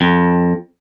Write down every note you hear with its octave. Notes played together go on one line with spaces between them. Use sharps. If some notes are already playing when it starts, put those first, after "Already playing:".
F2